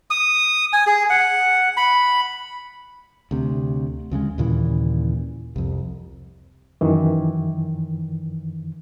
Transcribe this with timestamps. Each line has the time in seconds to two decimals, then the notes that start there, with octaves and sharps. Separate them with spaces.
0.10 D#6
0.73 G#5
0.87 G#4
1.10 F#5
1.77 B5
3.31 D2 C3
4.11 D2 C#3 E3 G#3
4.38 D#2 A#2 C#3 E3
5.56 C2 F2
6.81 F#2 D#3 E3